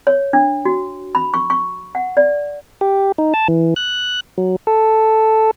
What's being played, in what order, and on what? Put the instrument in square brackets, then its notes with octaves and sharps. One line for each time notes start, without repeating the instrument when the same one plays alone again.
[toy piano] C#5
D4
F#4
B5
C#6
C#6
F#5
D5
[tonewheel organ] G4
D#4
A5
E3
F#6
F#3
A4